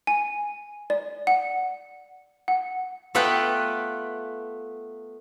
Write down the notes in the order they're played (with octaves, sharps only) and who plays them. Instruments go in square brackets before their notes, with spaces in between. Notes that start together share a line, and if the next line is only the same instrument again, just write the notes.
[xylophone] G#5
D5
F#5
F#5
[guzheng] A3 B3 F4 B4 F#5 G5